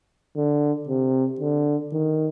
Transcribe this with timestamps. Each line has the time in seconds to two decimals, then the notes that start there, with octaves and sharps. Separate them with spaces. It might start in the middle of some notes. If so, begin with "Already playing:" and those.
0.37 D3
0.88 C3
1.40 D3
1.93 D#3